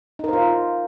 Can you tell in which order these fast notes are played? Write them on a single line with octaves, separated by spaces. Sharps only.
D#4 A#4 C5 F4